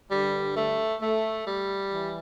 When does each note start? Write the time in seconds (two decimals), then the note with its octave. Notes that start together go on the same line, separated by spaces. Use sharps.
0.11 G2 D3 G3
0.56 A3
1.01 A3
1.46 G3
1.91 E3